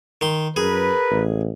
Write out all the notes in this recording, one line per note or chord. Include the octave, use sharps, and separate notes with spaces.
D#3 C6
F#2 G#4 A#4 B4
A1